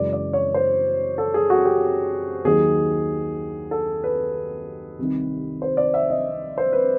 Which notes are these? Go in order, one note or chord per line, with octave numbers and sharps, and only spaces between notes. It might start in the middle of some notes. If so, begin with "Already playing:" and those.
Already playing: F#2 C#3 E3 G#3 D5
D5
C#5
C5
A4
G#4
F#4
G4
D#2 D#3 F#3 G#4
A4
B4
C2 C3 D#3
C5
D5
E5
D#5
C5
B4